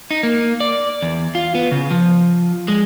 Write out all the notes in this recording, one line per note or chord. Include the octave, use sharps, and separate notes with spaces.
D#4
A#3
D5
E2
F4
B3
C#3
F3
G#3